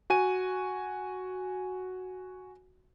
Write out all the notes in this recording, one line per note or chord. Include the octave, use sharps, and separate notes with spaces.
F#4 G#5 D#7